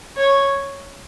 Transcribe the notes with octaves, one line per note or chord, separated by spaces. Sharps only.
C#5